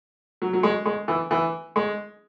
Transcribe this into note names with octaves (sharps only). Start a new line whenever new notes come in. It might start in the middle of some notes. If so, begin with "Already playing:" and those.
F#3
F#3
G#3
G#3
E3
E3
G#3